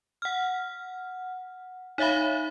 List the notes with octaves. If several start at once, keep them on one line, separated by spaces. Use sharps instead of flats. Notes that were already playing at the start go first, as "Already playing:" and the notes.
F#5 F6
D#4 C#5 E5 F5 B5